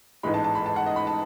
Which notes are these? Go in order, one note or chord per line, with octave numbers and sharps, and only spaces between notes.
A1 G#2 E3 G#3 B5
A5
A5
B5
A5
F#5
D#5
B5
A5